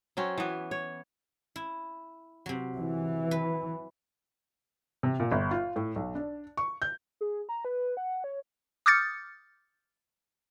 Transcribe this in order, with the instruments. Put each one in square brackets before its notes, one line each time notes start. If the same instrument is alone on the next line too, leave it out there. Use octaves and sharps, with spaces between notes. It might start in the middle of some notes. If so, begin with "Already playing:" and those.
[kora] F#3 C4 C#4
E3 B3
C#5
[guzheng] E4
C3 F#3
[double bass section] E3
[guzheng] B4
[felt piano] C3
A#2
G1
F4
A2
B1
D4
C#6
G6
[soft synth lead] G#4
A#5
B4
F#5
C#5
[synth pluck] D6 D#6 F6 G6 A6 C#7